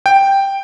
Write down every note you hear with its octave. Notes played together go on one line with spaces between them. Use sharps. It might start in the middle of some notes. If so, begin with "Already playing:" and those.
G5